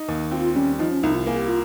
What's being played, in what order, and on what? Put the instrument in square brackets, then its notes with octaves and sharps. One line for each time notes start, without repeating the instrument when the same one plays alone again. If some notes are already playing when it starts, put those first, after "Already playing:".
Already playing: [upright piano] D#4
D#2
[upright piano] C4 [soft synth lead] F4
[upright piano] G3 [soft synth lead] C#4
[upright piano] F3 [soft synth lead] D#4
[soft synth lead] C#4
[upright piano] C2 [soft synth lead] D#4
[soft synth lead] F4
[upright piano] A#3 [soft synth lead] G#4
[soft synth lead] G4
F4